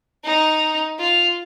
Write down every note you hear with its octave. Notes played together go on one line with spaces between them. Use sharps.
D#4
F4